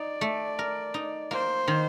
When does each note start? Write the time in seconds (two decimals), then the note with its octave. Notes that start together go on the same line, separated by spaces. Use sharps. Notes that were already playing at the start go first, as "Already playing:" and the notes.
Already playing: D#4 D5
0.21 A3
0.59 A#4
0.94 D#4
1.31 A#3 C5
1.68 D#3